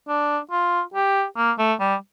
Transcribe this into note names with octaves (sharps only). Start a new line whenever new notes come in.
D4
F4
G4
A#3
A3
G3